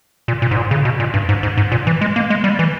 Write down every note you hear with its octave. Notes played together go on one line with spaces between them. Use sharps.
A#2
A#2
G#2
A#2
C#3
B2
A#2
G2
G#2
G#2
G#2
A#2
E3
G#3
A#3
G#3
G3
E3